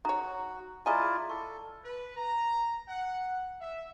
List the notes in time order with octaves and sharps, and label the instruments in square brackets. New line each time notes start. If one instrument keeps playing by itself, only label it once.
[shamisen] D#4 C#5 [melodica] F#4 [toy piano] A#5
[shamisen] G#3 D#5 G#5 [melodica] E4 F4 D5 [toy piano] A#5
[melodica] A4 [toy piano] C#6
[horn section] B4
A#5
F#5
E5